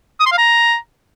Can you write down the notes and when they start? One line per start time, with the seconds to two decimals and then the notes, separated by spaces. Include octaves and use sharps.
0.20 D#6
0.26 C6
0.32 F5
0.38 A#5